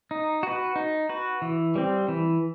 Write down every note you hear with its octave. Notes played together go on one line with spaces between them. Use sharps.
D#4
F#4 B4
D#4
F#4 B4
E3
G3 C4
E3